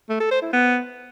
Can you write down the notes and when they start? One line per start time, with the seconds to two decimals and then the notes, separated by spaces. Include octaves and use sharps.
0.09 A3
0.20 A4
0.31 C5
0.42 E4
0.53 B3